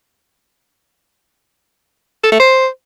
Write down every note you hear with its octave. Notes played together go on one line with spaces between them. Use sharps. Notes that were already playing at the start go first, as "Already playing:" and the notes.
A4
A3
C5